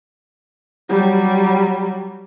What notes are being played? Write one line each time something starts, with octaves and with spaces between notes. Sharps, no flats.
F#3 G3